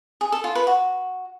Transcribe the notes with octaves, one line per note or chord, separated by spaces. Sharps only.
G#4
A4
F4
B4
F#4